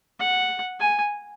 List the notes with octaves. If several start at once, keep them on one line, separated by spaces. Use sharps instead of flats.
F#5
G#5